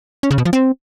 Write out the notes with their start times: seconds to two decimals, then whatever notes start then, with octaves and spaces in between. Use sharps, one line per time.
0.23 C#4
0.31 C#3
0.38 B2
0.45 F3
0.53 C4